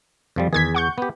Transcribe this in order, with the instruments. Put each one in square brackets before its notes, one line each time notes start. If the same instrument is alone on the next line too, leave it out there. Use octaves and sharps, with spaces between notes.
[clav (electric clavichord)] F2 F3 G3
[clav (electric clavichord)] E2 G#4 [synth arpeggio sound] D#3 G#6 B6
[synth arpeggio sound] F#5 C#6 G6
[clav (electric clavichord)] B3 G4